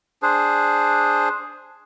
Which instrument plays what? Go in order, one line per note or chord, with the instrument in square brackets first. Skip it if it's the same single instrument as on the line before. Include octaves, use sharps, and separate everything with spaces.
[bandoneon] D4 G#4 C5